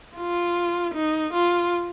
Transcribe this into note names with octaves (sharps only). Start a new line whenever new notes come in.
F4
D#4
F4